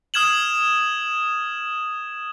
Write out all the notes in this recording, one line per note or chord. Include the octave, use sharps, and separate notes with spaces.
D#6 F6 G#6 E7 F#7